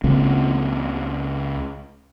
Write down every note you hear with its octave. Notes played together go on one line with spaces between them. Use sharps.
C#2 C#3 A#3 C4